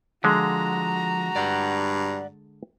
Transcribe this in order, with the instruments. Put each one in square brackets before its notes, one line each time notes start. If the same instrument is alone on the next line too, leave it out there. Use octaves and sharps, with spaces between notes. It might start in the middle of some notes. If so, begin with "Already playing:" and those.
[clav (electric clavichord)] D3 G#3 [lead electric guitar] F3 [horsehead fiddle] F#4 A#5
[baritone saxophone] G2 [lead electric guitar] D5 F#5